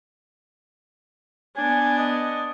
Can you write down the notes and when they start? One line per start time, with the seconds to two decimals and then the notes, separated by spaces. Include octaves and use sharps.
1.57 B3 D4 G#5
1.98 D#5